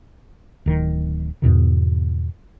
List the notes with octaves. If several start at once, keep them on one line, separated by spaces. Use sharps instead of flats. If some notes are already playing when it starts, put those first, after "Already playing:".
D1 D#3
E2 G#2 B2 D#3